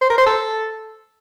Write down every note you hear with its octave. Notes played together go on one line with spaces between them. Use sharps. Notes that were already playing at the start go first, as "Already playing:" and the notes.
C5
A#4
C5
A4